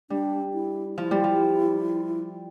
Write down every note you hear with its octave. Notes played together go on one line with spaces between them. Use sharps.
G3 D4
E4
F3 E4
G3
F3